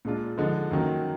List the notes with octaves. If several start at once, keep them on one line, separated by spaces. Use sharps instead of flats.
A#2 G#3 D4 F4
D3 F3 G#3 D#4
F#2 D#3 F#3 A#3